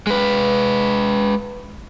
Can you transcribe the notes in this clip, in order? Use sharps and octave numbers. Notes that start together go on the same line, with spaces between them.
G#3 B4